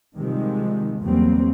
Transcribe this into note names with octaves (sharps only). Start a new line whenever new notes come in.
C3 D#3 F3 G3 G#3
E2 C#3 F#3 G3 A#3 C4